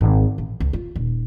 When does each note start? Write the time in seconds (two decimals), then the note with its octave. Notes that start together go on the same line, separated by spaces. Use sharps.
0.01 G#1
0.38 A1
0.60 C#2
0.73 F4
0.96 D#1